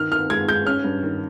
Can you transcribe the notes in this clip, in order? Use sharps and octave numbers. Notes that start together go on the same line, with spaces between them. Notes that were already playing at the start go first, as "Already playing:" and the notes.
Already playing: D#3 F6
D#3 F6
G#3 G#6
G#3 G6
C#4 F6
G2
D#3